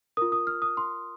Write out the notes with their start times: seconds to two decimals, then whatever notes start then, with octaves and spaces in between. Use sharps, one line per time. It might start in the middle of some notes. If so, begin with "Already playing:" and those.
0.17 F4 A#4 D#6
0.32 D#6
0.47 F6
0.62 D#6
0.77 C6